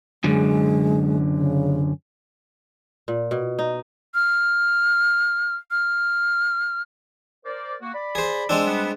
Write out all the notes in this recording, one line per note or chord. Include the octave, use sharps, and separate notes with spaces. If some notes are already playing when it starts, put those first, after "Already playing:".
F#2 D3 G#3
C#3
A#2
B2
D#4
F6
F6
A#4 C5 D5
A#3 F#4
D5 B5
G#4 C5
G#3 C4 D4 E6
G3 B3